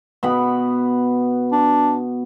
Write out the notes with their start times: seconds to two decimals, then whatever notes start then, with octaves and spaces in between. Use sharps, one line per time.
0.23 B2 B3 B5
1.52 D4